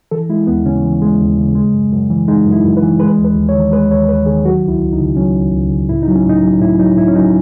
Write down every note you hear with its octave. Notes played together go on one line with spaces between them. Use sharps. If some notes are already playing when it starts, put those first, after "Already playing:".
E3 A4
G#3 E4
D#2 B3
C#3 C#4
E3
G#3
D#2
C#3
G#3
F#2
F#2
E3
G#3 D#4
F#2
E4
F#2
B4
E3
G#3 B4
D#2
B4
D#2
C#5
D#3
G#3 B4
D#2 C#5
D#2 B4
D#3 G#4
F#3 F#4
C#2 E4
C#2
D#4
C#3
F#3 C#4
C#2
C#2
C#3
A2 E4
D#4
F#3
C#4
A2 D#4
F#3
A2 E4
F#3 D#4
A2 E4
C#4
F#3 D#4